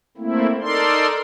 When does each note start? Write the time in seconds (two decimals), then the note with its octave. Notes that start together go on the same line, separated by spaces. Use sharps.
0.17 A3 A#3 C4 E4
0.61 D#4 A4 A#4 D5 C6